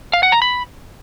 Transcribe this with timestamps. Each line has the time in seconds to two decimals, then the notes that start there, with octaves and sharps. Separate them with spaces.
0.13 F5
0.23 F#5
0.32 A#5
0.42 B5